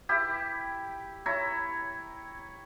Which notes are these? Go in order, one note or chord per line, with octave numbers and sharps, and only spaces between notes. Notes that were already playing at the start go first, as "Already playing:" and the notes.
E4 G4
E4 C#5 A#5